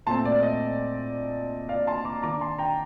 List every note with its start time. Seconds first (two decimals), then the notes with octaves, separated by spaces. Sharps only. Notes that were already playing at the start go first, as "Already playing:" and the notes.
0.07 A#2 A3 C4 A5 C6
0.25 D5
0.43 D#5
1.69 D5 F5
1.87 A5 C6
2.05 A#5 D6
2.22 D#3 A#3 D4 A#5 D6
2.41 A5 C6
2.59 G5 A#5